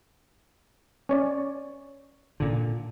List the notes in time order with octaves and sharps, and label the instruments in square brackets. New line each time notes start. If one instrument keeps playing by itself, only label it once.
[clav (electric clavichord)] C#4 C#5 D5
[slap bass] A#2 D3